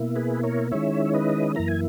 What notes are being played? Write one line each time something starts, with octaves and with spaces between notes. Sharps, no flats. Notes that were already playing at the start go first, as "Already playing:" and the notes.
Already playing: B2 A#3 E4
G#4 B4
A#4 C#5
D#3 G#3 C#4 E4 C#5 E5
C#5
B4 D#5
F#2 E3 A#3 E4 A#5
G#5